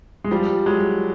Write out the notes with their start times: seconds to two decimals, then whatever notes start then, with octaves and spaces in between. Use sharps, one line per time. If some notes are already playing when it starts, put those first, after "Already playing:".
0.24 G#3
0.31 F3 G3
0.66 F#3 G#3